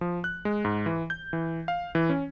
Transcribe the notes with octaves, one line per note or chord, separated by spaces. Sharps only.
F3
F#6
G#3
G#2
E3
G6
E3
F5
E3
C#4